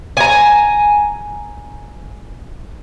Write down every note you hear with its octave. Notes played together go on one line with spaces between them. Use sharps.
G#5 A#5